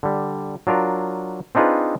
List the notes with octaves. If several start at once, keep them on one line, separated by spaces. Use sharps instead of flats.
D3 G3
F#3 D4 F4 A#4
C4 D4 D#4 F4 G#4 B4